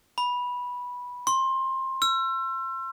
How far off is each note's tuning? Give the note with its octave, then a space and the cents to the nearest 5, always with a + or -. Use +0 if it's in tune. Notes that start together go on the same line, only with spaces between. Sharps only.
B5 -10
C6 +20
E6 +40